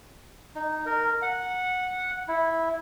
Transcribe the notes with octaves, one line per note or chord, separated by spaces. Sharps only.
D#4
A#4
F#5
E4